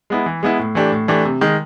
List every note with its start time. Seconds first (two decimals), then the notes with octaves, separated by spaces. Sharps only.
0.10 G#3 B3 E4
0.26 E3
0.43 G#3 B3 E4
0.59 A2
0.75 E3 A3 D4 G4
0.92 A2
1.08 E3 A3 D4 G4
1.25 C3
1.41 D#3 G#3